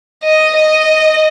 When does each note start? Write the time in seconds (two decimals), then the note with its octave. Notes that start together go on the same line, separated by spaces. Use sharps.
0.24 D#5
0.57 D#5